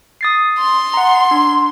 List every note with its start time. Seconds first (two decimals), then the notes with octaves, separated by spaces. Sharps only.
0.21 D#6 A6 C7
0.59 C6
0.94 F#5 A#5
1.31 D4